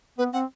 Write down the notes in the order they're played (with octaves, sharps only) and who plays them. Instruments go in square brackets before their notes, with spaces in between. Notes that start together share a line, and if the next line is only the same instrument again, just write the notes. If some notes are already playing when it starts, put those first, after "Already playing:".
[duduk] B3 [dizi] B4
[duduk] C4 [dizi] F#5